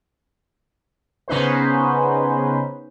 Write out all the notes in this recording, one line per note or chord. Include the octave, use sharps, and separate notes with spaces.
C#3 B3 C#4 D#4 B4 C5